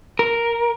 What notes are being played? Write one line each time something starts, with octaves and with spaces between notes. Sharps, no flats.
A#4